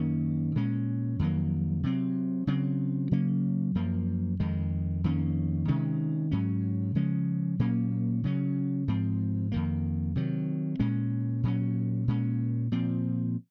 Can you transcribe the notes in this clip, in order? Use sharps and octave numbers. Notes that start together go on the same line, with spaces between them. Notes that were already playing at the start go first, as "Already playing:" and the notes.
Already playing: F#2 D#3 A#3 C#4
A#2 G#3 C#4
F2 D#3 F#3 A#3
C3 F#3 C4
C#3 F#3 C4
C#3 F#3 A#3 C#4
F#2 F3 A#3
F2 D#3 G#3
F2 D#3 A#3 C#4
C3 D#3 G#3 C#4
G#2 F#3 C#4
C#3 F3 G#3 C#4
A#2 F#3 A#3 C#4
C#3 F#3 C#4
G#2 F3 C4
F2 D#3 A#3
C3 D#3 F#3
A#2 G#3 C#4
A#2 F#3 C#4
A#2 G#3 C#4
A#2 F3 C4